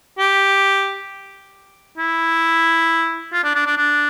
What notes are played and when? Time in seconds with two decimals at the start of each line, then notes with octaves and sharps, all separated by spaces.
0.18 G4
1.98 E4
3.33 F4
3.44 D4
3.55 D4
3.66 D4
3.77 D4